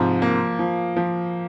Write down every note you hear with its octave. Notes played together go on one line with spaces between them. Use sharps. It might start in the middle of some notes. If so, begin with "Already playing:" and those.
Already playing: G#2 C3 F3
A#3
F3
F3